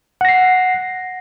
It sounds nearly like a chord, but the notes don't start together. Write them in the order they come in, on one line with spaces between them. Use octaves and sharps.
F#5 A#6 C7